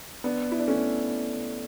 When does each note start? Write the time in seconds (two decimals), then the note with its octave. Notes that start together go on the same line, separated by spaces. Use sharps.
0.24 B3 D4
0.52 E4
0.59 D4
0.68 A3 C#4